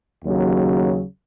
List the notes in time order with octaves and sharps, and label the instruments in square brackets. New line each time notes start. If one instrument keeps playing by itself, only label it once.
[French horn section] D#2 C#3 F#3